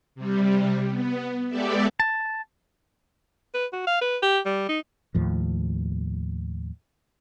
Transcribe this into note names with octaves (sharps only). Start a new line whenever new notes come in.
C3 G3
B3
G#3 B3 G4 A4 D5 E5
A5
B4
F#4
F5
B4
G4
G3
D#4
D#2 A2 F3